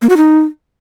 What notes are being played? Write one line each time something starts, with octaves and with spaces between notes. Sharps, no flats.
A#3
F#4
D#4